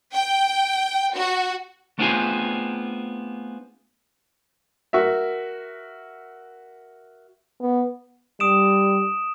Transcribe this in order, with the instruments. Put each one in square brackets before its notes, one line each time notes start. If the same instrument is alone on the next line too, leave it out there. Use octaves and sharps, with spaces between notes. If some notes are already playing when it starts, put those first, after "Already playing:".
[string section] G5
F#4
[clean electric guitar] A3 B3 C4 D4 F4 G#4
[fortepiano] F#4 A#4 E5
[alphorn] B3
[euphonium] G3 [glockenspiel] D#6 D7 E7